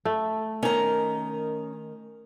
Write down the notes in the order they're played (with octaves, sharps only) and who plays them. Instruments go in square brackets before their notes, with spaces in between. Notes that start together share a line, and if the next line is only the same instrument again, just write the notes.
[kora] A3
[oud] D#3 [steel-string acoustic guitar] C#4 A#5